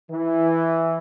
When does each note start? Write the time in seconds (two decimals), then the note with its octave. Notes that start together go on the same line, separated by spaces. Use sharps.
0.11 E3